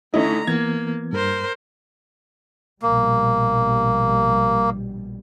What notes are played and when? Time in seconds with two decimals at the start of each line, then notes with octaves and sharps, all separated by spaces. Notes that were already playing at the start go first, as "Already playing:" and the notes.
0.14 D3 A3 C#4 D#4 E4 D#5 A#5
0.47 E3 A#3 B3 G#6
1.13 G2 A#4 C5
2.82 A#1 B2 G3 A#3